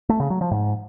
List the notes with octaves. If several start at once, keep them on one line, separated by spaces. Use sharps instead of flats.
A3
C#3
F#3
F3
G#2